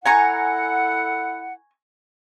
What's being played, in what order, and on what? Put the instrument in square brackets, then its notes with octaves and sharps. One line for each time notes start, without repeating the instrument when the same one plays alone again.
[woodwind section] E4 A4 F#5 [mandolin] G#5 A#5 C#6